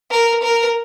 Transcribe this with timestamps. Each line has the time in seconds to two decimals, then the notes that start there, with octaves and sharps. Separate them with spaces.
0.11 A#4
0.43 A#4